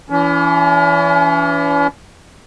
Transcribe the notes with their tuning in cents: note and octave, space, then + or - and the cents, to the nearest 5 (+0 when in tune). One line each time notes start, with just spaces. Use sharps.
E3 +20 C#4 +45